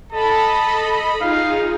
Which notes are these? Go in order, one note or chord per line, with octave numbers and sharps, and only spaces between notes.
A4 D#5 A5 B5
D#4 F4 G#4 F5